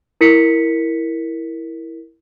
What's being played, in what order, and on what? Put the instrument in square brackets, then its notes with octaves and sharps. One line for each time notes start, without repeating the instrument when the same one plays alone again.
[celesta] E4 A#4 B6 C#7